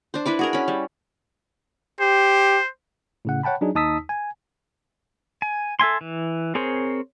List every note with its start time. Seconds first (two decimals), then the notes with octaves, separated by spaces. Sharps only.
0.14 D4 C5
0.26 D4 E4 B4 D5
0.39 F#4 G#4 A#4
0.53 C#4 B5
0.68 G3
2.00 G4 C5
3.25 A2 C#3 F#5
3.43 C#5 F#5 G5 A5 B5
3.61 F#3 D4 D#4 G#4
3.75 D#2 D#4 A5 D#6 E6 B6
4.09 G#5
5.42 G#5
5.80 A4 E5 G#5 C6
6.01 E3
6.55 C4 G#4 A#4 C5 C#5